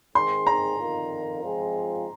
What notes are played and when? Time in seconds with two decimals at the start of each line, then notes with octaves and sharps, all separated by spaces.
0.15 G#2 D#3 C4 G#4 C6
0.47 A#5
0.78 F2 D#3 A#3 F4 A#4
1.42 F3 G#3 C4 F4 G#4